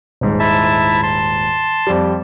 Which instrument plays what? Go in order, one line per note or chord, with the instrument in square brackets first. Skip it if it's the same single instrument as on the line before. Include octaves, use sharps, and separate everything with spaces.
[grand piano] D#1 G#2
[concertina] E4 E5 A5
A5 C6
[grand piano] F2 G3